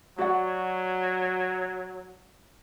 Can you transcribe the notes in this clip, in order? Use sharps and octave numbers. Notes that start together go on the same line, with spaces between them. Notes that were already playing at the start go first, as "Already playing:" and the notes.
F#3 F#4 D5 F#5